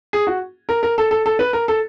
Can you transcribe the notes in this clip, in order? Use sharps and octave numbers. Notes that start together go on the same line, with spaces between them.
G#4
F#4
A#4
A#4
A4
A4
A4
B4
A#4
A4